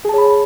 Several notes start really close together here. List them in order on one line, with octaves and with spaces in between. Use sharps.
G#4 A5 C#5 B5